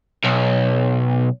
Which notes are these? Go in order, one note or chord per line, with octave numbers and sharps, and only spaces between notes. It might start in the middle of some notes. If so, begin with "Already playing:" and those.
B1